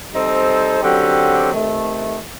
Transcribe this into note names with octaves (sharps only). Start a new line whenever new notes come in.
G3 C4 D#4 A4 C5
F#2 D3 F#3 C4 G4
C3 D#3 A3